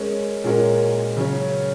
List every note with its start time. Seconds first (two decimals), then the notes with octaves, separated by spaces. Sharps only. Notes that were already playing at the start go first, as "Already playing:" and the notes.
Already playing: G#3 C#4 A#4
0.44 A#2 G#3 C#4 F#4 A#4
1.17 C#3 F#3 C#4